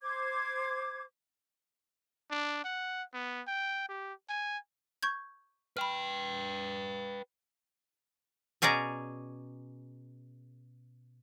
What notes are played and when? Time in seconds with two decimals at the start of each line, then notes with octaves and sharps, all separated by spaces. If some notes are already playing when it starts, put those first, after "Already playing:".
0.02 C5 D6 G#6
2.31 D4
2.64 F#5
3.14 B3
3.48 G5
3.88 G4
4.29 G#5
5.03 C#6 G6 G#6
5.77 B4 G5 B5 F6
8.62 B2 C#4 G#4 D5 A#5